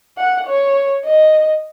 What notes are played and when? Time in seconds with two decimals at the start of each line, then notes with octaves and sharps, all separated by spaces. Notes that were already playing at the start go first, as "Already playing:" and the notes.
0.17 F#5
0.47 C#5
1.05 D#5